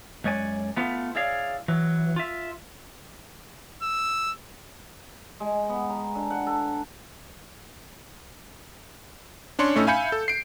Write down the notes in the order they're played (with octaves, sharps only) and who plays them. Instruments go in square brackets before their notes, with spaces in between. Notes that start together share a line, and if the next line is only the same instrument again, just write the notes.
[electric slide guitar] F#2 G#3 C#5 D5 G#5
A3 B3 F4
E4 G#4 C#5 D5 F5
E3 F#3
F4 E5
[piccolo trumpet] E6
[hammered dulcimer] G#3
B3
A#5
D3
F#5
A4
[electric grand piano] C#4 D4 C#5 C6 C#7
A2 A3 C#4 D#4 E6
E5 F5 G#5 B5 G6 C#7
A4
C7 D7